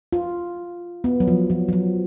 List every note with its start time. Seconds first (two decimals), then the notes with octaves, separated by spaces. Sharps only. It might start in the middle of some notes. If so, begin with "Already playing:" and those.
0.13 F4
1.04 B3
1.20 F#3
1.28 F3
1.50 F3
1.69 F3
1.73 F#3